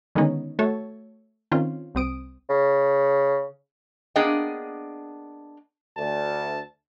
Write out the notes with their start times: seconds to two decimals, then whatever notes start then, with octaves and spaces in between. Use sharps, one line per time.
0.15 D3 D#3 G#3 B3 C#4 D#4
0.59 A3 F#4 A4 C#5 A5
1.52 D#3 C4 C#4 F4
1.95 C2 C4 D#6 D7
2.50 C#3
4.16 A#3 B3 D4 G#4 D#5 G5
5.97 D2 A5